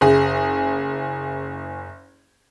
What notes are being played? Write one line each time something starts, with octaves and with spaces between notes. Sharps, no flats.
F#1 G#4